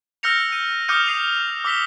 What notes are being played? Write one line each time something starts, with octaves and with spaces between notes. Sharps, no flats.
E6 F6 G6 A#6 C#7 F7
D#7
D6 D#6 F6 G6 C#7 D#7
D#6 C7 D#7 F7
D6 E6 B6 G7